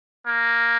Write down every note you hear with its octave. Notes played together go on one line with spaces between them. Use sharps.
A#3